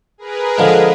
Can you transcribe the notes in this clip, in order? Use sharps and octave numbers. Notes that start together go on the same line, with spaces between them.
G#4 A#4 B4
D3 F3 G#3